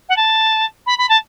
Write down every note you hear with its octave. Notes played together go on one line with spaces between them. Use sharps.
F#5
A5
B5
B5
A5